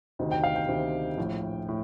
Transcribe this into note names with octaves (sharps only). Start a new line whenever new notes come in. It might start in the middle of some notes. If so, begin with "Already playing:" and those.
D2 C3 D#3
G5
F5
G5
D2 C3 D#3
A#1 A2
A2